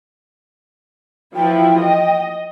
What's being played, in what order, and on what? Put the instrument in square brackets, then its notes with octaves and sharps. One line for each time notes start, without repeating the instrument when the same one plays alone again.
[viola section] E3 F3 E4 [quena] G5
[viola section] D#5